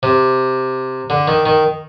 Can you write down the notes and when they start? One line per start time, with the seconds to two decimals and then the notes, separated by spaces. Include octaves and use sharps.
0.03 C3
1.10 D3
1.28 D#3
1.46 D#3